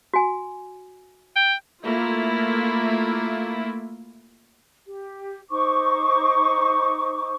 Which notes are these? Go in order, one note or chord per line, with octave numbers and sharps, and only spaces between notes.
F#4 G#5
G5
A3 A#3 E4 F4
G4
D#4 C5 C#6 D6